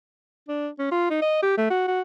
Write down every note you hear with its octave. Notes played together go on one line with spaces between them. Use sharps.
D4
C#4
F4
D#4
D#5
G4
A3
F#4
F#4